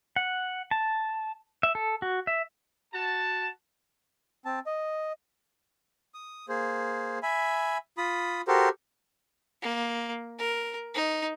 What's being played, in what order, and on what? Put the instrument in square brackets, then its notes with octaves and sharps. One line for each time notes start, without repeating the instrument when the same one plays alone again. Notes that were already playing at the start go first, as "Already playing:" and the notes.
[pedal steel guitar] F#5
A5
E5
A4
F#4
E5
[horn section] F#4 A5
[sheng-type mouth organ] C4 A5
D#5
D#6
A#3 G#4 C5
E5 G#5 B5
F4 B5 D#6
F#4 G4 A4 A#4 C5
[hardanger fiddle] A#3
A#4
D#4